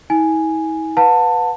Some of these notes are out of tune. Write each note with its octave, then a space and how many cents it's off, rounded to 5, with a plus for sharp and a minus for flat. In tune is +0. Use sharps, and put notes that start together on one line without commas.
E4 -45 G#5 +0
B4 +0 F#5 -40 A5 +20